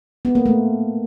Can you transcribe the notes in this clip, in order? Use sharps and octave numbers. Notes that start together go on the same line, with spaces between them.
B3
A#3
A3